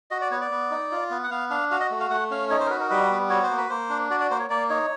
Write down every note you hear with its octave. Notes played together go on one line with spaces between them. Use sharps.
F#4 D#5
D5
B3 C#5
D5
B3
D#4
F4
B3
F#5
B3 F5
D4 F5
F#4 F5
D#5
A3
F5
A3 F#5
C#4 F5
D#4 C#5
C5
A#4
F#4 B4
A#4
G3 B4
B3
F#4 C#5
C5
A#3
B4
A#3 C5
D4
F#4 D5
D5
A#3 C5
C#5
A#3 D5
D#4 C#5